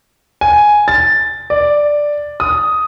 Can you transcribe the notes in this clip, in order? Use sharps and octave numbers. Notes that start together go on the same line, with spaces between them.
G#5
A6
D5
D#6